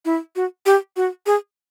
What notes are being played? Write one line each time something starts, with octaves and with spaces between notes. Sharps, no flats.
E4
F#4
G4
F#4
G#4